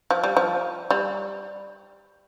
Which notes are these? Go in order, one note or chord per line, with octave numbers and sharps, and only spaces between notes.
F3
G3
F3
G3